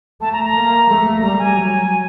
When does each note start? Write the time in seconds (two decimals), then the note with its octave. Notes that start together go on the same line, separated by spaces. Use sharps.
0.21 A3 A5
0.33 A#5
0.44 A#5
0.55 A#3
0.89 A3
1.21 G3 A#5
1.39 G#5
1.55 F#3